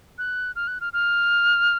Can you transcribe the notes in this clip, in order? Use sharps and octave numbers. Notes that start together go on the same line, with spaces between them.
F#6
F6
F#6
F6
F6